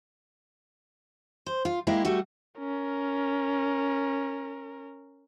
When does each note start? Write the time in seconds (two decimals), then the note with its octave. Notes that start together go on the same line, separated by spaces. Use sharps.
1.46 C5
1.65 F4
1.87 G#3 A#3 E4 G4
2.05 G3 A3 F#4
2.59 C#4 A#4